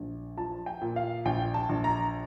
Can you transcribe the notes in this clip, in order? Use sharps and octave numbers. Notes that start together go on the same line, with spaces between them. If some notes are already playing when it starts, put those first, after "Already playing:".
Already playing: A#1
F3 A5
G5
A#2
F5
A#1 G5
A5
A#1
A#5